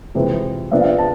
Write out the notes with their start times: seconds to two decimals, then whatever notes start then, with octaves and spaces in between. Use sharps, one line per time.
0.15 F2 C3 E3 G#3
0.71 C3 F3 B3 D4 E5
0.81 F5
0.84 E5
0.98 A5